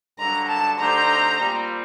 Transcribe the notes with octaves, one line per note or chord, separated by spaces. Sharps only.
G2 D3 F#3 A#5
A5
D3 A3 D#4 G4 C5 A#5
A#2 G3 C4